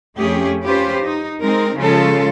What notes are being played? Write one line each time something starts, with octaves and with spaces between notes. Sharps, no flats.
F2 A3 C#4 G4 G#4
C#4 F4 G4 B4 C5
D#4
G#3 C4 D#4 A#4
C#3 F3 G#3 C#4 F4 A4